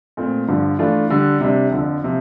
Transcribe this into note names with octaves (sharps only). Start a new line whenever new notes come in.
A#2 A3 C4
G2 D3 F3
E3 A3 D4 F4
D3 G3 D4
C3 G3 D4
F2 D3 F3
C3 F3